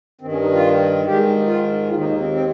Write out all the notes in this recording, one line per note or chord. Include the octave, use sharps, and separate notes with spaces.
G2 D#3 C4
C#4
D#4
F4
G#2 D#3 G4
F4
D#2 D#3 F4
D#4
D#4
C4
C4